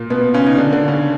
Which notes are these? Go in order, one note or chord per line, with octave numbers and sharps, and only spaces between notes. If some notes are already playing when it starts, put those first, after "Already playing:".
Already playing: A#2 A#3
B2 B3
C#3 C#4
D#4
D3 D4
D3 D4
C#3 C#4